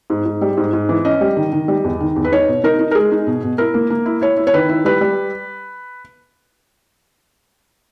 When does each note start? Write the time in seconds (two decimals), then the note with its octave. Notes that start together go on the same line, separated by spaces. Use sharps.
0.10 G#2
0.26 G#2
0.41 G3
0.57 G#2
0.73 G#2
0.89 E3
1.05 C#4 D#5
1.21 G3
1.36 D#3
1.52 D#3
1.68 G3
1.84 E2
2.00 D#3
2.16 E2
2.24 B4
2.32 D#4 C#5
2.48 B2
2.64 D#4 A#4
2.79 D#4
2.91 A#4
2.95 G#3 G#4
3.12 D#4
3.27 B2
3.43 B2
3.58 E4 A#4
3.74 A#3
3.90 A#3
4.06 E4
4.21 E4 C#5
4.37 E4
4.47 C#5
4.54 D#3 B4
4.69 E4
4.85 G3 B4
5.01 G3